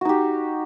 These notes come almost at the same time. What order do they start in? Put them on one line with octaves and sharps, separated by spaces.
F#4 D#4 G4